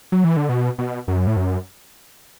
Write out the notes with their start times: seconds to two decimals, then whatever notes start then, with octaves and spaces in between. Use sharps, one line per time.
0.12 F#3
0.24 E3
0.37 D3
0.49 B2
0.78 B2
1.08 F#2
1.27 A2
1.37 F#2